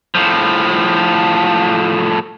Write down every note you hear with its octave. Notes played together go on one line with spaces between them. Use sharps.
A2 F3